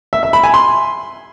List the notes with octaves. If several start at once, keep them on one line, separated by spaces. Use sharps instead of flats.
E5
E5
B5
G#5
C6